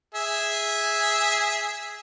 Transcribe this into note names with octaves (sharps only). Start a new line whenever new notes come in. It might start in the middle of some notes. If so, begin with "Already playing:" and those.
G#4 E5